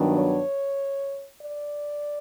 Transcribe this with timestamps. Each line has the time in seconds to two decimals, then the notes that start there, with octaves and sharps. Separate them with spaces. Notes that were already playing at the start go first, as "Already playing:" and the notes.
Already playing: G2 D#3 F#3 B3 D4
0.16 C#5
1.42 D5